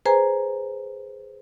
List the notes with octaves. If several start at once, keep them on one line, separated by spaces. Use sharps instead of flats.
G#4 B4 C5 G#5 A#5